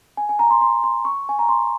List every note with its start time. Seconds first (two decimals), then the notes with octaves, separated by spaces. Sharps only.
0.17 G#5
0.29 G#5
0.39 A#5
0.50 C6
0.61 C6
0.84 C6
1.05 C#6
1.29 G#5
1.39 A#5
1.49 C6